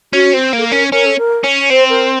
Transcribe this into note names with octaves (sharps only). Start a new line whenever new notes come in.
C#4 F#4
C4
A#3
A4
A#4
C#4
C#4 A#4
A4
A#4
C#4
C4 C5
A#4